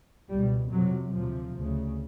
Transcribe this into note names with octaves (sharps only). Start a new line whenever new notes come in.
C#2 B2 G3
F2 C3 F#3
D2 C3 F3
D2 C#3